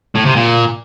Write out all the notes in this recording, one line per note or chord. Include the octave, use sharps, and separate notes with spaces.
A2
C3
A#2